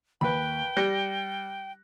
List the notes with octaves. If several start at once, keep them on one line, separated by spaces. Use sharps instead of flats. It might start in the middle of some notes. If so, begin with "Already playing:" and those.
D#2 B4 G5 B5
G3 F#6 A#6 C#7